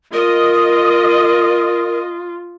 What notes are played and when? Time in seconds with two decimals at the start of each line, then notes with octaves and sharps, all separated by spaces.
0.13 F4 A#4 D#5